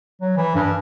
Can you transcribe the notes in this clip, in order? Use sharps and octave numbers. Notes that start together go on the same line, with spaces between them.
F#3
E3
G2